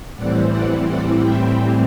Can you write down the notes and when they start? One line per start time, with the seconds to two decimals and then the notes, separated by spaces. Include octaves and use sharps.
0.15 A2 E3 G3 C4 D5 F#5
0.51 D5 F#5
0.87 D5 F#5
1.24 E5 G5